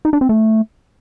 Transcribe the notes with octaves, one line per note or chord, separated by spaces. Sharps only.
D#4
D4
C4
A3